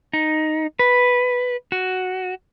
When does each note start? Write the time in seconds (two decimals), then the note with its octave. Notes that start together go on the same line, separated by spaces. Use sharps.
0.13 D#4
0.79 B4
1.72 F#4